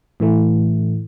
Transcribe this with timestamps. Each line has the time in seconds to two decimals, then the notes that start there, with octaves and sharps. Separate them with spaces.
0.20 A2 E3 A3